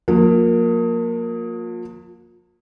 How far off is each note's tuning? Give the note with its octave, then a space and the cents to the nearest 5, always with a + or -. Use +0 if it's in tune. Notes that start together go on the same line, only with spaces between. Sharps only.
F3 +40 A#3 +0